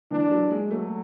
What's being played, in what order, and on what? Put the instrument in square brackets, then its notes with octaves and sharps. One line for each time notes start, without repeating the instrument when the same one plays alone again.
[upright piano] E3 [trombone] D4
[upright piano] F#3
G#3
[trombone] F#3 [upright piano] A3